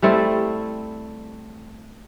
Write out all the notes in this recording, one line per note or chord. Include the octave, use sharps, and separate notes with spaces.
G3 A3 C4 E4